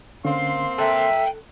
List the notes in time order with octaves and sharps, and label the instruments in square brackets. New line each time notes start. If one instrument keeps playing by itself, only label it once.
[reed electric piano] D3 C#4 [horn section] A#3 C4 C6 [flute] F5
[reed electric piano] A4 F#6 [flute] E5 [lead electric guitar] G5 A#5